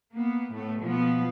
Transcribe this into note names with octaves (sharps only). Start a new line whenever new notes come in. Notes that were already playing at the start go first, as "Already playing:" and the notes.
A#3 B3
A2 A3 B3
B2 F3 B3